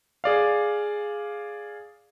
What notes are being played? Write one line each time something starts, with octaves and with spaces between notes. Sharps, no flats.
G#4 D5 F5